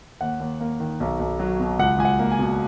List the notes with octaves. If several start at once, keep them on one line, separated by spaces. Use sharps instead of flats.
D#2 F#5
D#2
A#3
D#3
B1
B1
F#3
B2
C#2 F#5
C#2 G#5
F#5
A#3
G#5
B2